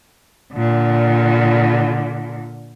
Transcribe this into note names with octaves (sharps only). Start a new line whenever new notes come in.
A#2 D3